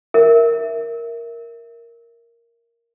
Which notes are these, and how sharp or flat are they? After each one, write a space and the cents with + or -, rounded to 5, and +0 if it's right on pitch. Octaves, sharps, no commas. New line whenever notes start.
A#4 +0 E5 +0